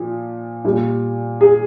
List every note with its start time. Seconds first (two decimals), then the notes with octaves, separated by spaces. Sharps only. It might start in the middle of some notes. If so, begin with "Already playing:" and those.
Already playing: A#2 F3
0.65 A#2 G3
1.41 G#4